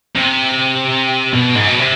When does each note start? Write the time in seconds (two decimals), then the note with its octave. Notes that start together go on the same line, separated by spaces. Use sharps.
0.15 C3
1.32 B2
1.55 G#2
1.67 B2
1.79 C3